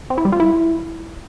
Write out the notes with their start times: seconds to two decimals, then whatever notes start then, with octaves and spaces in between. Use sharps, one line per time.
0.10 C4
0.18 E4
0.25 G3
0.32 F4
0.40 E4